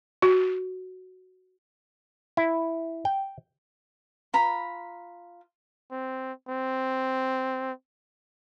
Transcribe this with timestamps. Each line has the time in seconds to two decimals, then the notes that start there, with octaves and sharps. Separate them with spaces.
0.22 F#4
2.37 E4
3.05 G5
4.33 F4 A#5 B5
5.91 C4
6.49 C4